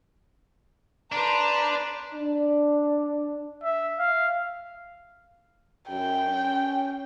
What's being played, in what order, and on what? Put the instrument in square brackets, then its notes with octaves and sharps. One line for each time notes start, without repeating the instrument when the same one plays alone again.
[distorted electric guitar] D4 [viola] B4 C5 [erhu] A#5
[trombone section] D4
[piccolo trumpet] E5
F5
[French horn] F#2 [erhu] G5
[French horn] C#4